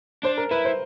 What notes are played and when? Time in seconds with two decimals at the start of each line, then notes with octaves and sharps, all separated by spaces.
0.23 D4 C5
0.38 A#4
0.51 E4 B4
0.65 C5